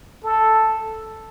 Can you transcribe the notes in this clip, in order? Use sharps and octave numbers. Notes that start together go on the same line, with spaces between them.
A4